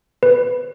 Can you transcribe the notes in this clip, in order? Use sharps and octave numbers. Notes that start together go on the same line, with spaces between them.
B4